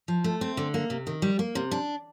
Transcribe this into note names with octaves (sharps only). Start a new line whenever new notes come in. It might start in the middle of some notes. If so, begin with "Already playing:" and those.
F3
A3
C4
D3
A#3
C3
D#3
G3
A#3
C3
D4